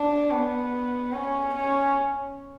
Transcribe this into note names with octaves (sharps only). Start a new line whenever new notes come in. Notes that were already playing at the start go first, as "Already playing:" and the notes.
Already playing: D4
B3
C#4
C#4